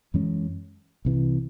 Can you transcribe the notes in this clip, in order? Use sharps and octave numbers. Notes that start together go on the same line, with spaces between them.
F#2 E3 G#3 C#4
C2 C3 E3